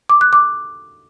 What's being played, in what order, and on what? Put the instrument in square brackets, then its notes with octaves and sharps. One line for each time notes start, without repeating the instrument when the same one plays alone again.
[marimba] D6
F#6
D6